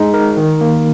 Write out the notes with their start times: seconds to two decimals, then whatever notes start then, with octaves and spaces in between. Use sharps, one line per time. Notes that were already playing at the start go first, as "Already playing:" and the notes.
Already playing: G#3 D#4
0.14 A#4
0.37 D#3
0.61 A#3